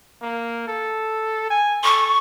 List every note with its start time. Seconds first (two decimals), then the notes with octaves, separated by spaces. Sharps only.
0.21 A#3
0.68 A4
1.50 G#5
1.84 A4 C#6